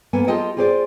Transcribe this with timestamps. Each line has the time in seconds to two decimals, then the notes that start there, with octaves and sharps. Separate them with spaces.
0.13 A#3 B3 A4 G#5
0.27 F4 G4 A4 D#5 G5
0.57 F4 G4 G#4 C5 D5